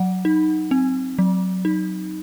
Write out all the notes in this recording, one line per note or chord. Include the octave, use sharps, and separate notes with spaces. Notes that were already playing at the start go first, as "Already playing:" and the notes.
Already playing: F#3 F#5
D#4
C4
F#3
D#4